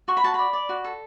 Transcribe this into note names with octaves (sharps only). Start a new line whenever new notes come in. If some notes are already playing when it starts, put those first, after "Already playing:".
F#4 C#6
B5
F#4 A5
D5 B5
D5
F#4
A4